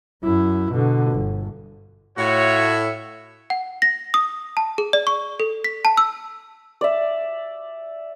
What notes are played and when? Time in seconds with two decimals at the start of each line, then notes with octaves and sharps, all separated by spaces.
0.24 F#2 E4
0.72 B2 D3
1.12 G1
2.18 A2 F4 F#4 C#5 E5
3.50 F#5
3.82 A#6
4.14 D#6
4.57 A5
4.78 G#4
4.93 D5
5.07 C#6
5.40 A4
5.64 B6
5.85 A5
5.97 E6
6.81 D5 E5